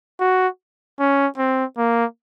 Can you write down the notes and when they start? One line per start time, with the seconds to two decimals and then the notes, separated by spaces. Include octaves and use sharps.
0.20 F#4
0.99 C#4
1.37 C4
1.77 A#3